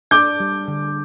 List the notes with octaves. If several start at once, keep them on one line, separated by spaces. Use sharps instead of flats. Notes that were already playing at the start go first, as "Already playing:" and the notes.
D4 D6 G6
G3
D3